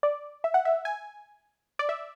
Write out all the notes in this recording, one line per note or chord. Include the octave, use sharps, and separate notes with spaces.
D5
E5
F#5
E5
G#5
D5
E5